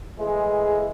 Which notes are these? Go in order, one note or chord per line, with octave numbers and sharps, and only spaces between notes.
A2 E3 G#3 G#4